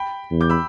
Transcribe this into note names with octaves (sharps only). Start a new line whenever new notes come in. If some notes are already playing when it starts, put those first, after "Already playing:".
Already playing: G5 B5
E2
D6 G6
B5 E6